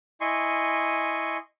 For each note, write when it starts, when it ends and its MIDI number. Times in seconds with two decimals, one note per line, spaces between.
0.21 1.37 64
0.21 1.37 75
0.21 1.37 80
0.21 1.37 84
0.21 1.37 85